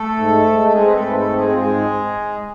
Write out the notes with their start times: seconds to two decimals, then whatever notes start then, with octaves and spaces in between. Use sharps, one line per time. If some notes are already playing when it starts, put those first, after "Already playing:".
Already playing: A3 A4
0.16 G#2
0.44 G#2
0.68 A4
0.72 G#3 C4 G#4
0.87 B4
0.93 A3 A4
1.01 G#2
1.06 B4
1.15 A3 A4
1.29 C4
1.37 G#3 G#4
1.52 F4
1.58 G#2 G#3 G#4